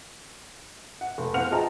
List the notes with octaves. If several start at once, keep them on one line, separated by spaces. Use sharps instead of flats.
F#5
F1
E2 C4 F5 F#5 F6 F7
F4 G#4 D#5 G5 A5 A#5